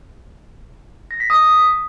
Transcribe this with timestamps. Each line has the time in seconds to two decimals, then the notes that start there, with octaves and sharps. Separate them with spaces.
1.11 A#6
1.20 B6
1.30 D#6